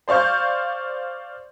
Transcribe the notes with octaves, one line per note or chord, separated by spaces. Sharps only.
C5 D5 F5 C#6 G6